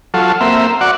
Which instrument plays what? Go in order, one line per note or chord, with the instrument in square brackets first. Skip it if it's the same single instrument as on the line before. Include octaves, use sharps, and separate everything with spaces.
[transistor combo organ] F#3 F4 A4
A#3 C4 E5
F#4 D5 F#5